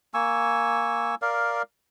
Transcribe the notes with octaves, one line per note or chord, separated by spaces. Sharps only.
A#3 G#5 C#6 E6
A#4 D5 F5